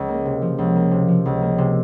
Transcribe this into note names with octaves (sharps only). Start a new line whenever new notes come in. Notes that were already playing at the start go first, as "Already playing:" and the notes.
Already playing: C#2
A#3
C3
F3
C#2
A#3
C3
F3
C#2
A#3
C3